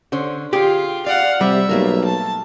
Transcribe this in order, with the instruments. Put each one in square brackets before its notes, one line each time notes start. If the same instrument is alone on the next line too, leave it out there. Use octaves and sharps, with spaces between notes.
[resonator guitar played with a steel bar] D3 C#4 C5
[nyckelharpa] F4 [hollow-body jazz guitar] G4 [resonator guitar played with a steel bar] G#4 G5
[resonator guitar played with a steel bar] D5 [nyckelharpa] F5 F#5
[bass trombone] C3 [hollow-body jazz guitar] G3 [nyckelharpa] E5
[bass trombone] B1 [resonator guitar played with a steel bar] A3 A#3 A#4
[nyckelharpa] A5